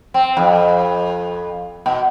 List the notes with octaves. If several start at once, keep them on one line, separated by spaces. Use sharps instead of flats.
C4
F2
B2